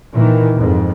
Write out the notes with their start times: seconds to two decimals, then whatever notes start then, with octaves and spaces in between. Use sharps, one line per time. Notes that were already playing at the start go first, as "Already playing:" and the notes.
0.14 A#2 D#3 E3
0.59 F2 G#2